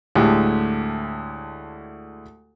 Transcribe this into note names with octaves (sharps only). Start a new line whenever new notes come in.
D2 A2 G#3 G4